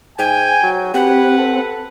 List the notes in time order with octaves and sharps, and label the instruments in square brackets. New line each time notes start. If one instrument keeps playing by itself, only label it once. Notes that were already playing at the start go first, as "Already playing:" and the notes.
[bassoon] G#2 [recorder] G5 [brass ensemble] G#5
[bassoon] F#3
[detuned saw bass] C4 [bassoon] G4 [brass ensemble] B4 [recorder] F#5
[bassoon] A4